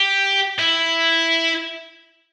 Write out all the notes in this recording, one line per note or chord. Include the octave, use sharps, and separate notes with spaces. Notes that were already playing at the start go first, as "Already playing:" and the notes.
Already playing: G4
E4